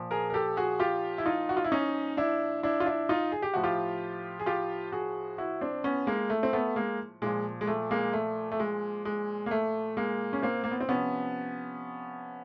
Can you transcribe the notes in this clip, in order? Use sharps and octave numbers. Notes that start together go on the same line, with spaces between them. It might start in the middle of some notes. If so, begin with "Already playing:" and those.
Already playing: A#2 F3
G#4 A#4
A#4
G4 A4
F#4 G#4
F4 G4
E4
D#4 F4
F#4
F4
E4
C#4 D#4
D4 E4
D4 E4
F4
D4 E4
D#4 F4
G#4
G4
A2 F3 F#4
F4 G4
G#4
F4 G4
F#4 G#4
E4 F#4
C4 D4
B3 C#4
G#3 A#3
A3
C4
A3 B3
G#3 A#3
A#2 F3 G#3
G#3
A3
G#3 A#3
A3
A3
G#3
G#3
A#3
A3
G#3 A#3
C#4
A#3 C4
A#3
B3
C4
C3 F3 B3 C#4